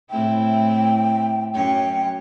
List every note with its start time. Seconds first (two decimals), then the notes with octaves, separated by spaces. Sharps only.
0.10 A2 C4 E4 G5
1.54 F#2 C#4 C#5 G5